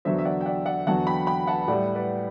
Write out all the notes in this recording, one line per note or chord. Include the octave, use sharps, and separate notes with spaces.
E2 D3 F#3 C5 E5
E5
D5 F#5
G5
D5 F#5
D5 F#5
E2 D3 F#3 F#5 A5
G5 B5
G5 B5
F#5 A5
A2 G3 D5 F#5
B4 D5